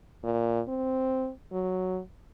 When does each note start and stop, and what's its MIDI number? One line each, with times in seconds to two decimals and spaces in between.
0.24 0.61 46
0.68 1.31 60
1.52 2.00 54